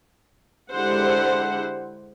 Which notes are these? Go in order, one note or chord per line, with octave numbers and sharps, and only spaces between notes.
D3 G#3 E4 G4 C5 F#5